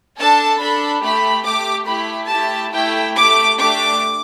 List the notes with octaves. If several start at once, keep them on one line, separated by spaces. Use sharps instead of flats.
D4 A4 A5
D4 A4 B5
A3 G4 B5
A3 G4 D6
A3 E4 G4 B5
A3 E4 G4 A5
A3 E4 G4 G5
A3 G4 D6
A3 D4 G4 D6